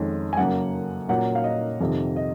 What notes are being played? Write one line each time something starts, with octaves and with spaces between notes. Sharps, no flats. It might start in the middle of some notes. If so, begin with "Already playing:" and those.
Already playing: F2 D#3 G#3 C#4
G#5
F#2 C#3 F#3 A#3 F#5
A#2 F#3 A#3 C#4 F#5
F5
D#5
F2 C3 D#3
D#5